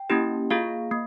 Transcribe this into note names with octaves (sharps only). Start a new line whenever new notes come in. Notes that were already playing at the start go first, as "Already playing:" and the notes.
Already playing: G5
A#3 C#4 E4 G4
A#3 F4 G#4 F5
A#3